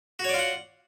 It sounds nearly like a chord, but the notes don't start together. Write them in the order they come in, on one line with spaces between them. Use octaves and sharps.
F#4 C#5 D5 F4 F#5